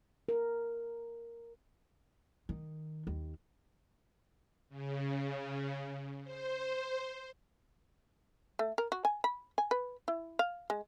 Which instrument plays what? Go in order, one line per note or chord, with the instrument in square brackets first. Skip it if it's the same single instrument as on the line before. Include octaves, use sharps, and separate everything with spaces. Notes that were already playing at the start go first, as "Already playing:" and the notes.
[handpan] A#4
[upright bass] D#3
D#2
[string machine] C#3
C5
[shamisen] A3
A#4
F#4
G#5
B5
G#5
B4
E4
F5
G#3